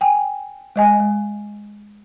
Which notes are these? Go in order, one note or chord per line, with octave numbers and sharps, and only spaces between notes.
G5 G#5
G#3 D#5 G#5
G#3